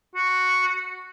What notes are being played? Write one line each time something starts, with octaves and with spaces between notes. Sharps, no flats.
F#4